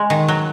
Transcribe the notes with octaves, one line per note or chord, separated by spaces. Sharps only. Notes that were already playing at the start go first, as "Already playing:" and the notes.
Already playing: G#3
D#3
F#3